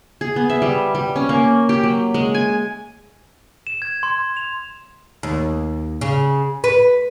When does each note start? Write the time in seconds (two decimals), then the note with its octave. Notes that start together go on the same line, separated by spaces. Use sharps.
0.21 G#4
0.36 B3
0.50 E5
0.62 G3
0.95 G3
1.16 C#4
1.29 A#3
1.69 G4
1.83 F#3
2.14 G#3
2.34 G#5
3.67 E7
3.82 G#6
4.03 C6
4.37 F7
5.23 D#2
6.01 C#3
6.64 B4